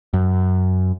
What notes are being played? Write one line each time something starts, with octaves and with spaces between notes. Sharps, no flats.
F#2